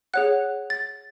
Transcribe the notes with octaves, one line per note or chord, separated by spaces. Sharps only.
G#4 C#5 F#5 F#6
A6